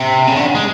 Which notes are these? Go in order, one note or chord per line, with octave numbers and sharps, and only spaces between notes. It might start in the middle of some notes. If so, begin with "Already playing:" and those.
Already playing: C3
C#3
D3
G#3